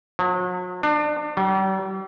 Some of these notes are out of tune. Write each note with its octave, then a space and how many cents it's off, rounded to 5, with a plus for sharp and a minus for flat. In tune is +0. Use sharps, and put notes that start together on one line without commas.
F#3 -40
D4 +30
G3 -40